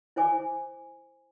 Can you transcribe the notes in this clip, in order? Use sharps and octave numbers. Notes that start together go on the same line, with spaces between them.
E4 C5 G#5 D6